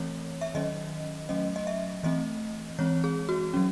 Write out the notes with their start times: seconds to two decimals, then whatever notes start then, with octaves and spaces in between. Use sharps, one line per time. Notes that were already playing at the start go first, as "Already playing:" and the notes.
Already playing: E3 A3 C4 C#5
0.41 E5
0.55 D#3 F#3 C#4 D#5
1.29 F#3 A3 C#4 D#5
1.56 D#5
1.67 E5
2.03 E3 A3 C4 D#5
2.79 E3 G#3 C4 C#5
3.04 G#4
3.29 F#4
3.54 F#3 C#4